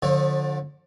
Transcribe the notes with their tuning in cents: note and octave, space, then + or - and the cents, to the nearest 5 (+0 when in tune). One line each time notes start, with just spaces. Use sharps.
D3 +0 F3 +30 C#5 -40